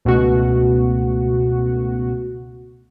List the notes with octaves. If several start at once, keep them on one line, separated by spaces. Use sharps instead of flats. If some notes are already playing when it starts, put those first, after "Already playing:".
C#2 B2 A3 F#4